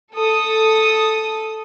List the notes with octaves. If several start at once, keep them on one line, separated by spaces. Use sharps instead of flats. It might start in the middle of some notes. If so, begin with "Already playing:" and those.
A4 D#6